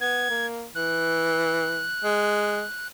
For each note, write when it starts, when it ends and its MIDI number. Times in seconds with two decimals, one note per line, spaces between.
0.01 0.26 59
0.01 0.46 92
0.30 0.66 58
0.75 1.89 52
0.75 2.87 90
2.04 2.63 56